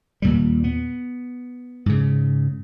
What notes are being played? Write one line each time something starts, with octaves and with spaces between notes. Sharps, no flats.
D#2 A#2 G3
B3
G#2 C#3